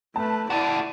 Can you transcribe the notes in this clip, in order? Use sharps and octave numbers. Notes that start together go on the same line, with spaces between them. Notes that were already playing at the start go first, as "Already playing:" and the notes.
A3 B4 A5
E4 F#4 A4 D5